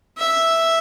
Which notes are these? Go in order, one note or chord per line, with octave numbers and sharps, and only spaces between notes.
E5